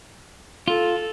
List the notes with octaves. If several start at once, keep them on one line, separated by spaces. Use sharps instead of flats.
F4 A4